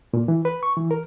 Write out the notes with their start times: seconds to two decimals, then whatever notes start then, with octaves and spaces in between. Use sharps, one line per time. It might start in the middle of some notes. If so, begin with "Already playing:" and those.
0.14 A#2
0.28 E3
0.45 B4
0.63 C#6
0.77 E3
0.91 A#4